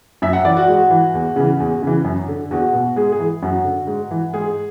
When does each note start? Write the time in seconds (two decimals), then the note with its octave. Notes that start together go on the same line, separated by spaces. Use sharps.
0.22 F#2 E5
0.33 F#5
0.45 E3 D5
0.57 F#4
0.68 G#2 F#4
0.90 E3
1.14 E2
1.36 C#3 E3
1.60 E2
1.82 C#3 E3
2.04 F#2
2.28 D3
2.51 E2 F#4
2.73 B2
2.96 G#2 G#4
3.12 G#4
3.20 E3
3.42 F#2 F#4
3.64 D3
3.87 G#2
4.11 E3
4.33 G#2 G#4